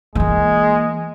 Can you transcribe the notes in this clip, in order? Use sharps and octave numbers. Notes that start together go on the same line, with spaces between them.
E3 G#3 A#3